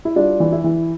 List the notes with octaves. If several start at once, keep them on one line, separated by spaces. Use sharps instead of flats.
E4
G3 D4 F4
E3
E4
E3